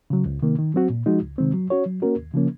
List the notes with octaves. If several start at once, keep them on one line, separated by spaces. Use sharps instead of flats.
C#3 F#3
C#2
C3 D#3 A#3
D#3
F#3 C4 F#4
A#2
F3 G#3 D#4 F#4
C#2
C3 D#3 G#3 C4
F#3
C#4 F#4 C#5
F#3
A#3 C#4 F#4 A#4
D#2
C#3 F3 A#3 C#4